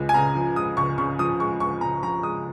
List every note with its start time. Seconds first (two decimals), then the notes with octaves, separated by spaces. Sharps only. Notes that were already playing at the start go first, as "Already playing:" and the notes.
Already playing: C#2 G#3
0.09 G#5
0.14 C#3 A#5
0.35 F3
0.56 G#3 D#6
0.77 C#2 C#6
0.98 C#3 C#6
1.19 F3 D#6
1.40 G#3 C#6
1.60 C#2 C#6
1.81 C#3 A#5
2.03 F3 A#5
2.23 G#3 D#6